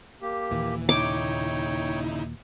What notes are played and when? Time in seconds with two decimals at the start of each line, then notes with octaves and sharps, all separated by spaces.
0.22 A#3 G4
0.51 D#2 A#2 E3
0.89 C#3 D#4 E4 C#5 G5 D6